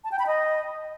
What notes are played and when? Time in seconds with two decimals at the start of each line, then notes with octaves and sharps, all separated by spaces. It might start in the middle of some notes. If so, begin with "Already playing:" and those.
0.04 A5
0.12 G5
0.19 B5
0.27 D#5